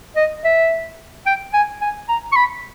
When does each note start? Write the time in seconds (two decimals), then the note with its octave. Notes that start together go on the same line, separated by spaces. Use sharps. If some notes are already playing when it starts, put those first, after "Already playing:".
0.16 D#5
0.45 E5
1.26 G5
1.54 G#5
1.81 G#5
2.09 A#5
2.32 C#6
2.36 B5